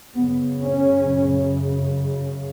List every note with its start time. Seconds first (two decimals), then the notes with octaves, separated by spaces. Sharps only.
0.15 F#2 C#3 B3
0.60 C#4